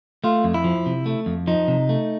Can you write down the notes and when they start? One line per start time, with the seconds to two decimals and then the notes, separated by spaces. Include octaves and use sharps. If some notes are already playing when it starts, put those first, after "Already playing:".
0.24 A3 F4
0.44 F2
0.54 E4
0.64 F3
0.86 C3
1.06 A3
1.26 F2
1.47 F3 D#4
1.68 C3
1.89 A3